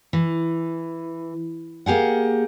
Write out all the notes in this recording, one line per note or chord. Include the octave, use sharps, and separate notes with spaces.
E3
A#3 G4 G#4 F#5